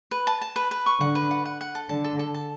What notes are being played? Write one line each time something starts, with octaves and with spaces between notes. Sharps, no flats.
B4
A5
A5
B4
B4
C#6
D3 F#5
B4
F#5
F#5
F#5
A4
D3 A5
A4
A4
A5